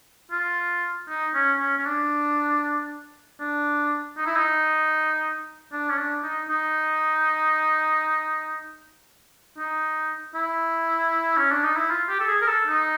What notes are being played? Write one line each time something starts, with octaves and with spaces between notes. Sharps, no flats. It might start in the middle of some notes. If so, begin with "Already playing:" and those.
F4
D#4
C#4
C#4
C#4
D4
D4
D#4
E4
D#4
D4
C#4
D4
D#4
D#4
D#4
E4
C#4
D4
D#4
E4
F4
G4
A4
G#4
A#4
A4
D#4